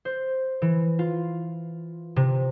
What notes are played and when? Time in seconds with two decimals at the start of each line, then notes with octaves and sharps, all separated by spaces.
0.05 C5
0.62 E3
0.99 F4
2.16 C3